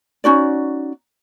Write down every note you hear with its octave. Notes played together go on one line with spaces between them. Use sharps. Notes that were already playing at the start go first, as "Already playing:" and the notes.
C#4 D#4 F#4 D5